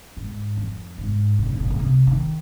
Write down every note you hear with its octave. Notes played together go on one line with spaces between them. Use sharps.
G#2
F2
G#2
C3
A#2
G#2
A#2
A#2
C3
D#3